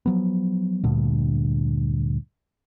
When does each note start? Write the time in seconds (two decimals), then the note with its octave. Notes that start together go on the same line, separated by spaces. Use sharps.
0.06 F3 F#3 B3
0.84 D2 G2 A#2 D3